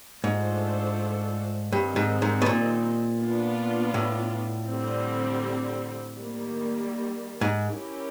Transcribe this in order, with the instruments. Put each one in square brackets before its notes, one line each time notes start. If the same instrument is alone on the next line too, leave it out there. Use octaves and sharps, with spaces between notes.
[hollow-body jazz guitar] G#2 [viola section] A3 D4 F4 A4 C5
[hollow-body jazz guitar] G2 [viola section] D#3 G3 C4 D#4
[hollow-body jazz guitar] G#2
G#2
B2
A#2
[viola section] B3 D4 F4
[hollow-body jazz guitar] A2
[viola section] D3 G3 C4
D#3 G3 A#3
[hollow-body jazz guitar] G#2
[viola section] C#4 E4 G4 A#4